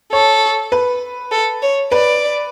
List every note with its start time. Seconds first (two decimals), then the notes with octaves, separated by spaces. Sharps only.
0.13 A4 C#5
0.72 B4
1.32 A4
1.62 C#5
1.92 B4 D5